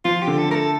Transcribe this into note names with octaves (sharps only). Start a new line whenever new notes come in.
F3 F4
G4
D3
A4
A3 A#4
A4